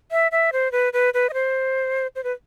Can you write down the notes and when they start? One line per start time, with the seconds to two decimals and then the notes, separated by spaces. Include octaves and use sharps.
0.11 E5
0.32 E5
0.53 C5
0.72 B4
0.93 B4
1.14 B4
1.29 D#5
1.34 C5
2.16 C5
2.24 B4